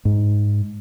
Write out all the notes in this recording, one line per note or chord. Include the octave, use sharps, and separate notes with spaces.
G#2